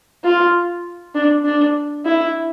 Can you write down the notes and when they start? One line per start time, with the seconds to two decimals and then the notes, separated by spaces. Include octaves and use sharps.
0.24 F4
1.15 D4
1.45 D4
2.05 E4